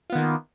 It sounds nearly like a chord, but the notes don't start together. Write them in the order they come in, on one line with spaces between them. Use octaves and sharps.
F4 B3 D#3 A#3